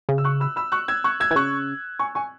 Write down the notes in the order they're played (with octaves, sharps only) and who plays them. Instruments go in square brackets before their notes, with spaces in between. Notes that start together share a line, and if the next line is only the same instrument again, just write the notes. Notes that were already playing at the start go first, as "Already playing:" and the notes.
[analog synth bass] C#3
[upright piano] E6
C#6 F#6
B5 E6
B5 E6
C#6 F#6
E6 G#6
C#6 F#6
E6 G#6
[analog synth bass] E3 [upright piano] G#6
[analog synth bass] C#3 [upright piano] C#6 F#6
[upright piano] G#5 C#6
G#5 C#6